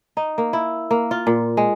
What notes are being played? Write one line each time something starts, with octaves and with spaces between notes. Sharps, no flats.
D#4
A#3
E4
A#3
F4
A#2
G#3